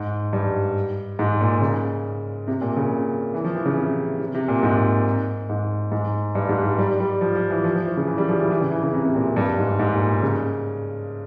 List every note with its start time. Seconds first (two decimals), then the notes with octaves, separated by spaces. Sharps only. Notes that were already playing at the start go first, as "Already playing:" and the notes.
Already playing: G#2
0.33 G2
1.19 G#2
1.41 A#2
1.61 C#3
2.48 C3
2.61 A#2
2.76 C#3
3.34 E3
3.44 F3
3.56 E3
3.66 C#3
3.77 C3
4.20 C3
4.34 C3
4.48 A#2
4.63 G#2
5.50 G#2
5.92 G#2
6.35 G2
6.49 G#2
6.63 G3
6.78 G3
7.00 G3
7.21 F3
7.35 F3
7.50 E3
7.64 F3
7.75 F3
7.86 E3
7.97 C#3
8.08 E3
8.18 G3
8.28 F3
8.39 E3
8.51 E3
8.61 C#3
8.71 E3
8.83 C#3
8.93 C3
9.05 C3
9.15 A#2
9.36 G2
9.59 G#2
9.79 G#2
9.94 A#2
10.22 C#3